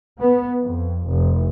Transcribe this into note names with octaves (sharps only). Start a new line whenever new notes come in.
B3
F2
F1